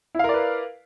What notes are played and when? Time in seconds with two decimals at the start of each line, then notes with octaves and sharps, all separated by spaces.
0.15 E4
0.19 F5
0.24 A#4
0.29 D5
0.34 B4